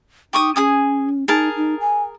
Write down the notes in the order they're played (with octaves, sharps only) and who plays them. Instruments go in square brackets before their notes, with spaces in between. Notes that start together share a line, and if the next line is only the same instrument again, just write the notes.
[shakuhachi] D#4 [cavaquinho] G4 C#6 D#6
[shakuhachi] C#4 [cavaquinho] G#4 G#5 D#6
[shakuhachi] D#4 [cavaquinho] G#4 A#4 A5
[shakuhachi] D#4
G#5